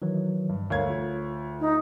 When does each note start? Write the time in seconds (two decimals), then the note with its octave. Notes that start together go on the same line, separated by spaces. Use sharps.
0.02 D#3 E3 F#3
0.49 G2
0.70 D2 A#4 C#5 F5 G#6
0.90 F4
1.60 D#4